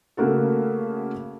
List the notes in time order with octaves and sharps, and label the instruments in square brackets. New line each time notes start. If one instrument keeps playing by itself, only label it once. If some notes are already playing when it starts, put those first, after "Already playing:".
[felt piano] C#3 A3 A#3 F#4 A4